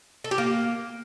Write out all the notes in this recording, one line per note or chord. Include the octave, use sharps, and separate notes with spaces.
A4
G4
A#3